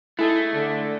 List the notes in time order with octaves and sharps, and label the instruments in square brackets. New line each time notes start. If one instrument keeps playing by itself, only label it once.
[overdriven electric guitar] A3 [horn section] D#4 G#4 A4 [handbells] E4
[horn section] D3